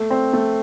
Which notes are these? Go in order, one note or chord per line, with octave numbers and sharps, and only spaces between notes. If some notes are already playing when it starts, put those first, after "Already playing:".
Already playing: A3
C4
A3